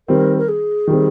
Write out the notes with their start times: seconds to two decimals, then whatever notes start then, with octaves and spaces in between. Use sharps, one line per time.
0.08 D#3 G3 C4 A#4
0.38 A#4
0.48 G#4
0.87 D#3 G3 C4